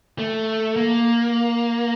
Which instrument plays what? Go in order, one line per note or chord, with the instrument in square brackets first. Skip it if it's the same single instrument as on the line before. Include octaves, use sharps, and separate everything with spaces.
[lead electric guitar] A3
A#3